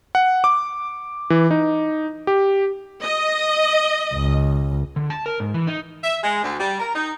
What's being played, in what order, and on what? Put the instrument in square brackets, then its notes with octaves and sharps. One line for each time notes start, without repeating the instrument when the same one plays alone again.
[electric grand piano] F#5
D6
E3
D#4
G4
[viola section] D#5
[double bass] C#2
[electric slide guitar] D3
A5
A#4
G#2
E3
D#4
[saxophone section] E5
G#3
D2
G3
A#4
D#4